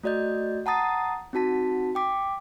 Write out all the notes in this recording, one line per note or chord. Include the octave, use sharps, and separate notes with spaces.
A3 F#4 D5 D#5 G6
F#5 A5 A#5 D#6 A6 C7
C4 D#4 F#4 A5 B6
G5 D6 B6